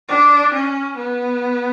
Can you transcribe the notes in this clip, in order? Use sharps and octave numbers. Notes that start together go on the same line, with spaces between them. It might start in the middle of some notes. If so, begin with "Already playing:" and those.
D4
C#4
B3